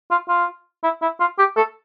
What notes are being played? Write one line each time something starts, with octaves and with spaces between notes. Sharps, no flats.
F4
F4
E4
E4
F4
G4
A4